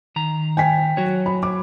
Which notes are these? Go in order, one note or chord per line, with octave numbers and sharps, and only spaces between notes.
D#3 A#5
G5 G#5 B6
F#3 F#4 C#5
B5
D6